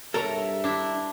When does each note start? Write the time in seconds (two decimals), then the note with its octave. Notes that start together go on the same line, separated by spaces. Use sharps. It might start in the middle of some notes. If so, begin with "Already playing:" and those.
0.14 G2 A4 A#4 C#5 E5 A#5
0.64 D4 E4